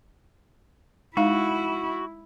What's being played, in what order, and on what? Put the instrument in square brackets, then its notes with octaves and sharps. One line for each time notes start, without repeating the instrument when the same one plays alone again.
[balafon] G#3 D#4 F5 [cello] E4 [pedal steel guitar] F#4